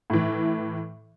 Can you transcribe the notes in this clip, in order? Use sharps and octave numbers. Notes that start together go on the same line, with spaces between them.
A2 E3